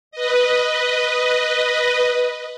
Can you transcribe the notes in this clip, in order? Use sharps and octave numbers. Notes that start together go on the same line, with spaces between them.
B4 D#5